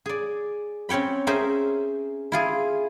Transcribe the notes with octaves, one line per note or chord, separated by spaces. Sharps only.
G#4 D5
C4 C#4 C#5 G5 B5
C#4 G#4 A#4 C5 E5
E4 F4 G#4